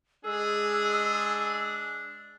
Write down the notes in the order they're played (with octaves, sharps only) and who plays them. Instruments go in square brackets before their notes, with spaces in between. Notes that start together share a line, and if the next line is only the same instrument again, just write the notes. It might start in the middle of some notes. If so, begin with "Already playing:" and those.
[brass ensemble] G#3 G#4 [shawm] D4 [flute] E6